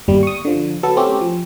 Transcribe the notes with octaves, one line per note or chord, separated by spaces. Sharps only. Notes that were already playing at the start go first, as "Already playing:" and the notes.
G1 D#2 G3
C#6 D#6
D3 F3
F#3 B3 A4
A3 C4 C#4 G4
F3